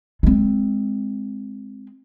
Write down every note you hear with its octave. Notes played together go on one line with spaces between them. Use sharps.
G#3 C4